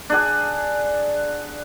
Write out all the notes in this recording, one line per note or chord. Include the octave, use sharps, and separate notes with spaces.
D4 G#4 F#5